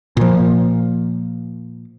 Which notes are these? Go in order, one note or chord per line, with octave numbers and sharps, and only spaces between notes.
A#2 F3